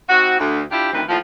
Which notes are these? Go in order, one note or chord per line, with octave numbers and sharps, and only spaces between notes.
C4 D#4 F#4
D2
D4 E4 F4 G4
D2 D#3 E3 C4 B4
D#2 A2 F3